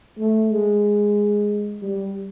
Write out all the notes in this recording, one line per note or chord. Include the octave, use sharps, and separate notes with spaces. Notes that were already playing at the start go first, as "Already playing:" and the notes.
A3
G#3
G3